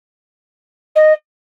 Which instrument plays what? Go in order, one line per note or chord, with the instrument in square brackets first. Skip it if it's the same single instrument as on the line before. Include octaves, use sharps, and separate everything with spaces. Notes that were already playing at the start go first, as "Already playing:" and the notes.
[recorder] D#5